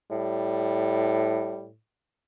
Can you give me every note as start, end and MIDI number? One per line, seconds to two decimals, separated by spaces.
0.11 1.78 45
0.11 1.66 55